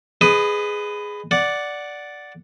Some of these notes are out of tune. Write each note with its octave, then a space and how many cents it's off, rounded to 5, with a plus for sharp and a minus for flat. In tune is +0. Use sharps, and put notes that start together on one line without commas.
G#4 +0 B4 +15 D#5 -25
D5 -5 F#5 +0